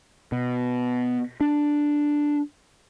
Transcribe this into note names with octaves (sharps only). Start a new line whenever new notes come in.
B2
D4